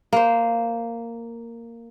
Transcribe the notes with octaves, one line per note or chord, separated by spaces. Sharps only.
A#3 C5